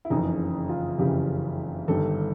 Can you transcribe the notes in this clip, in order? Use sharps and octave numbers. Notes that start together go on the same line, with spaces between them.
E4
F#1 F2 C#3 E3 D#4
F4
F#1 F2 C#3 E3 G4
G1 G2 D#3 A4